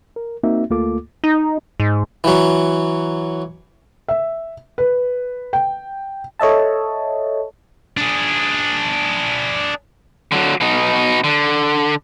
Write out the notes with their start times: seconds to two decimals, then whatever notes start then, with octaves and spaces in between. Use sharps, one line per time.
0.16 A#4
0.43 A#3 C4 D#4 F#4 E5
0.70 D2 A3 A#3 F4 A4 D6
1.24 D#4
1.80 G#2
2.24 E3 F#3
4.08 E5
4.78 B4
5.53 G5
6.39 A4 C#5 D#5 E5 A5
7.97 D4 G#4
10.32 D3 F#3
10.61 B2 D#4
11.24 D3